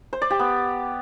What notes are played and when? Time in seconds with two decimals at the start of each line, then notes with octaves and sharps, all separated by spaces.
0.13 C5
0.22 D5
0.30 G4
0.39 B3